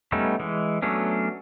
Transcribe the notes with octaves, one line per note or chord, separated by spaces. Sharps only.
G3 A3 B3 C#4 D#4
E3 G#3
F#3 A3 B3 C#4 D4